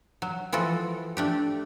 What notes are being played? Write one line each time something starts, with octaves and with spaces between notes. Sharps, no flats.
F#3
E3 F3 F#4 A4
A3 D4 G4